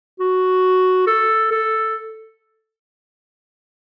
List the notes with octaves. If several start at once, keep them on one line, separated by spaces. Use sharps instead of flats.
F#4
A4
A4